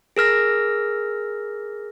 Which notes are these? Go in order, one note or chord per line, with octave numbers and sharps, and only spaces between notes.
G#4 A#4 F6 A#6